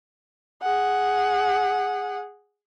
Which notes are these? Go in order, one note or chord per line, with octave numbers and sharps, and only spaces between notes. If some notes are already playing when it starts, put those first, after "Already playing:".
G#4 F#5